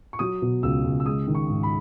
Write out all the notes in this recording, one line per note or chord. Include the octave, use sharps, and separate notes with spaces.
C#6
F#3 D#6
B2
C#2 E6
C#2
E6
G#3 D#6
D#3
C#6
G#2
B5